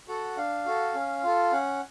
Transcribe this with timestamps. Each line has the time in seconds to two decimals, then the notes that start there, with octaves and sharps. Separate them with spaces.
0.08 F#4 A4 F#5
0.37 D4 F5
0.65 F#4 A4
0.95 C#4
1.23 F4 A4
1.52 C#4 F#5